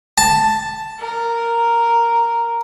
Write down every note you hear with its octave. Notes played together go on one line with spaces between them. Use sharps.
A5
A#4